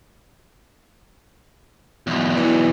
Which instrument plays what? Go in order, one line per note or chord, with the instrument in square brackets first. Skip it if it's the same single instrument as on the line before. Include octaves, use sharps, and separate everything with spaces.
[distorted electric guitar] B1 E2
[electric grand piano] E3